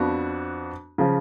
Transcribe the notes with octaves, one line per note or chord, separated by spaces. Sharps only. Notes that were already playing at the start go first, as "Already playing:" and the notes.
Already playing: F2 F3 B3 D4 F#4
C#3 F3